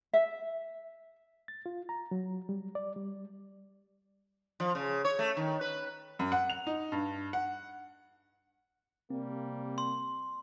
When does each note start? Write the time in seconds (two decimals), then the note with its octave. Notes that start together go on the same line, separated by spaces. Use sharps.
0.13 E5
1.48 A6
1.66 F4
1.89 A#5
2.11 F#3
2.49 G3
2.75 D5
2.96 G3
4.60 F3
4.75 C#3
5.05 C#5
5.19 A3
5.37 D#3
5.61 B4
6.19 F#2
6.32 F#5
6.50 F7
6.67 D#4
6.92 G2
7.33 F#5
9.10 C3 G3 A#3 C4
9.78 C6